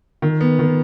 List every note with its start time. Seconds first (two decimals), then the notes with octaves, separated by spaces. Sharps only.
0.22 D#3
0.41 B3
0.59 D#3